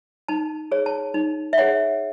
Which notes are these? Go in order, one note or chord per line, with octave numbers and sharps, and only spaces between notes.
D#4 A5
G#4 C#5
A5
D#4
E5
G#4 C#5 F#5